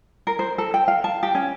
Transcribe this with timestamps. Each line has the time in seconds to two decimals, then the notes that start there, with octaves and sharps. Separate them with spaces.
0.27 A#4
0.39 C5
0.58 A4
0.74 G5
0.88 F5
1.04 A5
1.23 G4
1.35 C#4